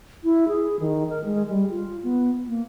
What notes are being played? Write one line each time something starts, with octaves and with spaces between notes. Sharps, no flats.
E4
G#4
D#3
A#4
G#3
G3
F4
B3
A#3